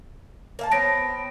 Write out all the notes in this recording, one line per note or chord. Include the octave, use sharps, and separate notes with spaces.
A#3 F5 A5
B3 C4 C#5 A#6 D7